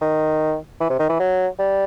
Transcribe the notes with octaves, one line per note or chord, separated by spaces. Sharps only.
D#3
E3
C3
D#3
E3
F#3
G3